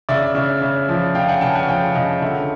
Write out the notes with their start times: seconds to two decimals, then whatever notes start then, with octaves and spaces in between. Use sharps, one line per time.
0.09 C#3 D5 E5
0.35 C#3
0.61 C#3
0.89 F3
1.14 C#3 F5 G5
1.28 F#5 G#5
1.41 C#3 G5 A5
1.55 F#5 G#5
1.68 F3 F5 G5
1.95 C#3 D#5 F5
2.22 D3 E5 F#5